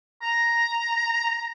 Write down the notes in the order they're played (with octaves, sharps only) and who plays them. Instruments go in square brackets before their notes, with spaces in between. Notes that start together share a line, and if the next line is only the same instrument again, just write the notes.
[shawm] A#5